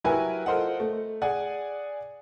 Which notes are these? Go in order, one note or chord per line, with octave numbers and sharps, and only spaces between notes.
F#3 E4 G4 A#4 B4 G#5
F4 A4 A#4 C5 D#5 F#5
A3
G#4 D5 F#5 G#5